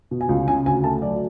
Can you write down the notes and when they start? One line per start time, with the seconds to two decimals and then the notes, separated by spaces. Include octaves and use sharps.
0.11 B2
0.21 G#5
0.29 C#2
0.48 C#3 G#5
0.66 D2 G#5
0.84 A3 A5
1.02 F#3 D5